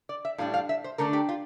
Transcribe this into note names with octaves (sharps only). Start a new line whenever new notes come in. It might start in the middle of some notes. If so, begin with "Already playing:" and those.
D5
E5
A2 G3 D4 F5
F5
E5
C5
D3 A3 D4 A#4
G4
F4